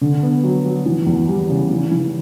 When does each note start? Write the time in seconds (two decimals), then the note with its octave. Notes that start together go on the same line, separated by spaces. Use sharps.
0.01 D3
0.23 B3
0.43 F#3
0.65 F#3
0.86 E3
1.07 E2
1.28 G3
1.49 C#3
1.71 E3
1.91 E3